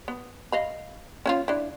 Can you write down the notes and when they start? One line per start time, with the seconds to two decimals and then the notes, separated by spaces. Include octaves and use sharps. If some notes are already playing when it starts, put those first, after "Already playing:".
0.08 B3
0.52 D#5 F5 B5
1.26 C#4 E4 F4
1.48 D4 E4